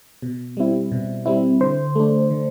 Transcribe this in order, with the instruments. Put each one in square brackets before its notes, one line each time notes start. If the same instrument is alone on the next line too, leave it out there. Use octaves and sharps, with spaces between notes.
[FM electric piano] B2
G3 C4 E4
B2
G3 C4 E4
D3 C5
A3 D4
D3